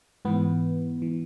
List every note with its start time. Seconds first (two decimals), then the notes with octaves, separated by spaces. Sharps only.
0.25 G#2 E3 B3
1.02 E3